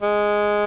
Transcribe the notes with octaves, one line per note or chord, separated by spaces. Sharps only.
G#3